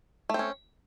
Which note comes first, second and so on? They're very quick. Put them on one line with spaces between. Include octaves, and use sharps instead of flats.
A3 C4 C#4